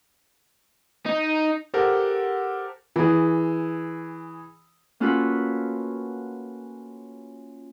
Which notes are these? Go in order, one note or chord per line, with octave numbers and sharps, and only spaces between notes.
D#4
G4 A4 A#4 C5 F#5
E3 G#4
A#3 C#4 F4 F#4 A4 B4